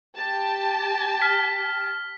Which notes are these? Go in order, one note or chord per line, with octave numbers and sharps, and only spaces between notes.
G4 A5
F6 B6